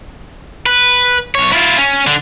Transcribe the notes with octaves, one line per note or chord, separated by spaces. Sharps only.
B4
B1 C#5
E4 F4
C#4
D3